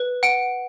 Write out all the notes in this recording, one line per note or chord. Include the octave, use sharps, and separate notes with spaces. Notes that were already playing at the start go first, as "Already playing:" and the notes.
Already playing: B4
F#5 D7